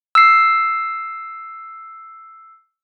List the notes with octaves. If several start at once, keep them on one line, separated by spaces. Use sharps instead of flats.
E6 C7